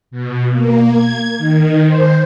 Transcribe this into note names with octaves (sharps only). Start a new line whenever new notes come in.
B2
A#3
G#6
D#3
C5